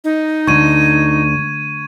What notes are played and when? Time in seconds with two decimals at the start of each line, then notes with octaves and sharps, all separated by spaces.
0.04 D#4
0.47 D2 C#6 G#6 D#7